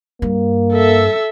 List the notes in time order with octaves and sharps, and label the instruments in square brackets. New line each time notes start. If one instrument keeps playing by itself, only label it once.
[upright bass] G2 [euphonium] A#3
[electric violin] A4 E5